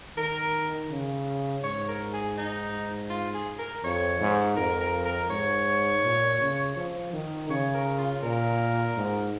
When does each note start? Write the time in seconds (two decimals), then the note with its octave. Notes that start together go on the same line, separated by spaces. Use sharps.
0.17 D#3 A#4
0.91 C#3
1.64 G#2 C#5
1.88 A#4
2.13 G#4
2.38 D#4
3.10 F4
3.34 G#4
3.58 A#4
3.84 F2 C#5
4.20 G#2
4.56 F2 A#4
4.81 A#4
5.05 A#4
5.30 G#2 C#5
6.03 A#2
6.40 C#3
6.76 F3
7.13 D#3
7.50 C#3 C#5
7.74 A#4
7.98 F4
8.23 A#2 A#4
8.97 G#2